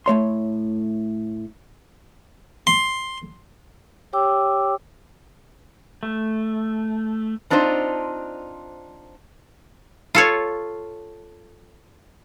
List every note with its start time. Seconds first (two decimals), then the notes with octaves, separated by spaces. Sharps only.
0.06 A2 A3 C#5 C6
2.67 C6
4.13 G4 C#5 G5 D6 E6
6.03 A3
7.50 C4 D4 D#4 F4 C5
10.15 F4 A4 C#5